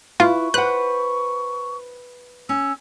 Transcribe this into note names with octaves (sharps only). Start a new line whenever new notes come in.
E4 F4 B4 C#6
B4 C5 F#5 F#6
C#4 E6